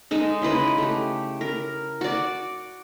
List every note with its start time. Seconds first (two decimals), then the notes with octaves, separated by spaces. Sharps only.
0.11 G#3 D#4 A4
0.42 C#3 E4 B4 D#5
0.78 A3 G4
1.41 A#4
2.01 F#4 D5